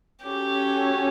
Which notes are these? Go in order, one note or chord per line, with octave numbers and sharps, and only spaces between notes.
C#4 F#4 G4 A4 C#5